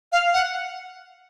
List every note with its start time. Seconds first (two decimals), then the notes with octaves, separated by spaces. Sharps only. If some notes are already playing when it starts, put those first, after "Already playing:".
0.12 F5
0.34 F#5